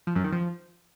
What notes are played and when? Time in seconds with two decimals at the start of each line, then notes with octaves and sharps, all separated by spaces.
0.07 F3
0.15 F#2
0.24 D#3
0.32 F3